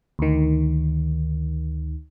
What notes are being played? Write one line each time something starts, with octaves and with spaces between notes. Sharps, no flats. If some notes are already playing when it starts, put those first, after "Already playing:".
D2 D#3